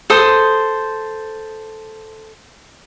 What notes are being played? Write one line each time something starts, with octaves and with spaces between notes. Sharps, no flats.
A4 C5 D#6